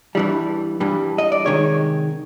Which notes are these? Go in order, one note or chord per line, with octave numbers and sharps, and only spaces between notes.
G2 E3 G3
G2 E3 G3
D#5
D5
C3 D#3 G#3 C#5